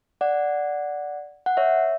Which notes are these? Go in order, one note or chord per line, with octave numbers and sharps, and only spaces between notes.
D5 F#5
F#5
C#5 E5